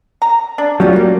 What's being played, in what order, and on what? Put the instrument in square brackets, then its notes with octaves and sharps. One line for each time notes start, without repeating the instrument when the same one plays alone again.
[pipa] A#5
D4
[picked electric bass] F#3 [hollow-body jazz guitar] G3 C#4 F4
[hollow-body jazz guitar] G3 A#3